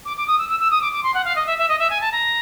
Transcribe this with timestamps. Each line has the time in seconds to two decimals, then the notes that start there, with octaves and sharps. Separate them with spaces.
0.05 D6
0.17 D6
0.27 D#6
0.38 E6
0.49 E6
0.60 E6
0.71 D#6
0.82 D6
0.92 D6
1.03 C6
1.14 F#5
1.25 F5
1.36 D#5
1.47 E5
1.58 E5
1.69 D#5
1.79 E5
1.90 G#5
2.01 A5
2.12 A#5